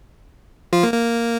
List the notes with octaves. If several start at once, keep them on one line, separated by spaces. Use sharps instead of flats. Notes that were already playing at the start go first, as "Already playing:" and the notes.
F3 F4
A#3
A#3